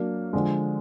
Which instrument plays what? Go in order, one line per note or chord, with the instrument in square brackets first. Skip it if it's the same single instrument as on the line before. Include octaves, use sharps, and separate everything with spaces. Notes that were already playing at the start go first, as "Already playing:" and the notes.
Already playing: [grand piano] F#3 A#3 D4
D3 F3 G#3